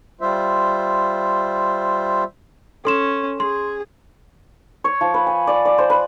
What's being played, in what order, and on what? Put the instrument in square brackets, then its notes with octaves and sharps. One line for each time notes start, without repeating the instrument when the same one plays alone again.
[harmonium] G3 F4 C5 E5
[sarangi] C#4 [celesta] A4 C6 E7
[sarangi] G#4 [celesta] C6
[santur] C#5
F3
B4
G#5
D5
D5
C5
B4